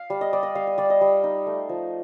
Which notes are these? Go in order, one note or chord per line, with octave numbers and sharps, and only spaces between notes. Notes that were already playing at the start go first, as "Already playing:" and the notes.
Already playing: F5
G3
D#5
G3 D5
D#5
G3 F5
D#5
G3 D5
D#5
G3
D#4
A3
F3